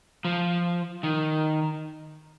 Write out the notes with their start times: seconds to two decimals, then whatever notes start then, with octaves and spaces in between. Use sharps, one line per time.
0.25 F3
1.03 D#3